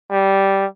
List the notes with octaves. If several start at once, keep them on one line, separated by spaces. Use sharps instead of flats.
G3